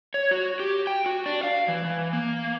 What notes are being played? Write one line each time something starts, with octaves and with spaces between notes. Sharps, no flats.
C#5
F#4
G4
G5
F#4
D4
F5
E3
E3
A#3